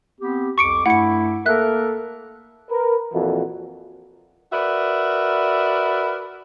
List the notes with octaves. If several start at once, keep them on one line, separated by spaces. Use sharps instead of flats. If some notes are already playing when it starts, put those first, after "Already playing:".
B3 C4 G4
C2 F2 C#6 D6 C#7 D7
G2 A3 E4 F#5 C#7
A#3 A4 A#4 E5 F#6
A#4 B4
F2 A#2 E3 F#4
F#4 A#4 B4 D5 E5